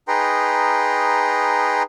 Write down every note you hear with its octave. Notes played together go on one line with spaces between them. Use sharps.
D#4 G#4 B4 G5 A#5 C6